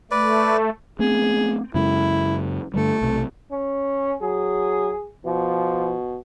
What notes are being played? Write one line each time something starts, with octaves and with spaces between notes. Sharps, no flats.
A3 B4 D5
A3 B3 C4 G#4
F#2 C#3 G#3 E4
G2 D3 G3 A3
B1 C3
C#4
F#3 G#4
B2 F3